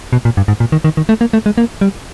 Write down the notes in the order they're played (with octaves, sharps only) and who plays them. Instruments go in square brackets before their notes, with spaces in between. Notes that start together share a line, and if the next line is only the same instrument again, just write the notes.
[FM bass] B2
A#2
G2
G#2
A#2
D#3
D#3
D#3
A3
A#3
A3
G#3
A#3
G3